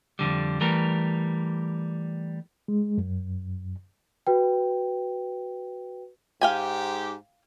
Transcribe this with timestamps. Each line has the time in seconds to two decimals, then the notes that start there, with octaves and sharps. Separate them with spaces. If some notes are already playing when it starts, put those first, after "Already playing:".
0.19 F2 G#2 D3 G3
0.61 E3 G3 A3 A#4
2.68 G#3
2.98 F#2
4.27 F#4 B4 G5
6.41 G#2 G4 F5 G5 G#5